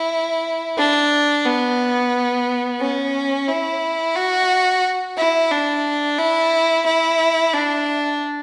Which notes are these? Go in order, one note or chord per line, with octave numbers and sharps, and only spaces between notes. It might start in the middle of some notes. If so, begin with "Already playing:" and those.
Already playing: E4
D4
B3
C#4
E4
F#4
E4
D4
E4
E4
D4